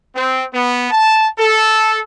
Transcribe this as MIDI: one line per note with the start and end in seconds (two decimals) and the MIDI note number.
0.15 0.44 60
0.53 0.91 59
0.91 1.26 81
1.38 1.99 69